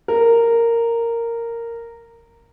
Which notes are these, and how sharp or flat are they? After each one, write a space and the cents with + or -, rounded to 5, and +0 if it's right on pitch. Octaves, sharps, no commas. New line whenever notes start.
A#4 -10